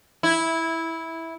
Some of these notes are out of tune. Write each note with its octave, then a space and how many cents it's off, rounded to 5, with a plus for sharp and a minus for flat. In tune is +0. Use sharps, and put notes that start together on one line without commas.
E4 -10